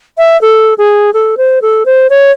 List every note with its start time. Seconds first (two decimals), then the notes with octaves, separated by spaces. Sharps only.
0.18 E5
0.41 A4
0.78 G#4
1.14 A4
1.37 C5
1.62 A4
1.86 C5
2.10 C#5